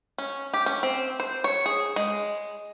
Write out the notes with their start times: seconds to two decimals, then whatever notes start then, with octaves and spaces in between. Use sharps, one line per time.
0.18 C#4
0.54 G4
0.66 C#4
0.83 C4
1.20 C5
1.44 C#5
1.66 G#4
1.96 G#3